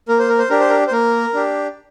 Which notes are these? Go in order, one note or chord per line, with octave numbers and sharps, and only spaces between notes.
A#3 A#4
C5
A#4
C5
D4 G4 A#4
C5
A#4
C5
A#3 A#4
D4 G4